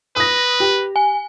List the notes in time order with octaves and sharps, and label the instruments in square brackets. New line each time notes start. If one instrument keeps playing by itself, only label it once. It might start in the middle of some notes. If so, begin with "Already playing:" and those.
[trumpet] B4 [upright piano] D#6 A#6
[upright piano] G4
[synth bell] G#5